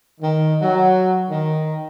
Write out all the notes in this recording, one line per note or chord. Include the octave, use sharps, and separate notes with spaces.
D#3
F#3
D#3